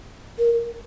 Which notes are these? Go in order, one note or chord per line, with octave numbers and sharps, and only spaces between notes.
A#4